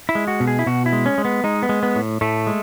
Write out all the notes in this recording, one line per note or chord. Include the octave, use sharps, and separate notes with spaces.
E4
G#3
F#4
B2
G#4
E4
B2 F#4
E4
G#3
C#4
G#3
B3
G#3 D#4
B3
G#3
B3
A2
A2 A3
G#3